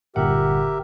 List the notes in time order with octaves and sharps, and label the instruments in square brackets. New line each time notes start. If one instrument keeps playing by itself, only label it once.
[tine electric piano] G1 A#2 F#5 [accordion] G4 A#4 E5